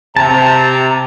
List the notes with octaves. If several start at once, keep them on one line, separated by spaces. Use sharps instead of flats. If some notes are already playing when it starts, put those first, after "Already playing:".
C3 A5 A#5